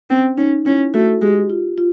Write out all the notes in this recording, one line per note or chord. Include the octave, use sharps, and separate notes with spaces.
C4 C#4
C#4 D#4
C#4 E4
A3 F#4
G#3 G4
F4
F4